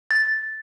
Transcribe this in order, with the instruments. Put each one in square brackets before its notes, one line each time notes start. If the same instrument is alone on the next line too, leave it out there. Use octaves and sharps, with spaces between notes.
[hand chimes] A6